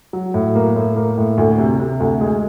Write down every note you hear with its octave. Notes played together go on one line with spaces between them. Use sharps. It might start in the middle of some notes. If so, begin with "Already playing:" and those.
F#3
A2
A#3
A2
A#3
A2
D2
C3
C3
D2
G#3